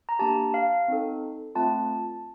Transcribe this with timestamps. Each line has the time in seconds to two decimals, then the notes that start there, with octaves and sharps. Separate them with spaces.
0.09 A#5
0.19 A#3 D4 G4 A5
0.54 F5
0.88 C4 D#4 A4
1.55 A3 C4 F4 A5